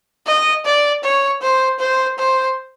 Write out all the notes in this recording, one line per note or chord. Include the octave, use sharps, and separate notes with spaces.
D#5
D5
C#5
C5
C5
C5